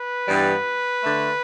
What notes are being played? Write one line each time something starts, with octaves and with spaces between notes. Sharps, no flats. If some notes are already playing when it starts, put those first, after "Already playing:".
Already playing: B4
G2 E3 G3 B3
D3 A3